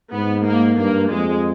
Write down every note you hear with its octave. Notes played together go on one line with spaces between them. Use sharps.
G#2 B3
A#3
G2 A#3
F2 G#3